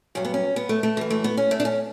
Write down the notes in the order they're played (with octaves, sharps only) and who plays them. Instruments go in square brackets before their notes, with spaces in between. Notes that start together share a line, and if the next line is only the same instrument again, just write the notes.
[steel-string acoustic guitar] G2 F#3 C#4
B3
C#4
B3
A3
A3
F#2 E3
A3
B3
C#4
A3
D4
C#4